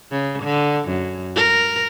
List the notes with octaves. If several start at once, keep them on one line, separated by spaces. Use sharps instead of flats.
C#3
D3
F#2
A#4